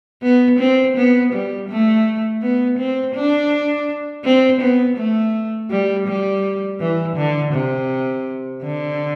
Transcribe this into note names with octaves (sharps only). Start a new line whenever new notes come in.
B3
C4
B3
G3
A3
B3
C4
D4
C4
B3
A3
G3
G3
E3
D3
C3
D3